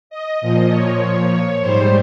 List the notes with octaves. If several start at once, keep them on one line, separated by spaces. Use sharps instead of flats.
D#5
A#2 F3 D#5
C#5
G#2 G3 C5